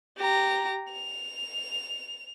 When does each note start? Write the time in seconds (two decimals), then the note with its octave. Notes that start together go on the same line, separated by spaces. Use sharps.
0.17 G4 A#5
0.92 F7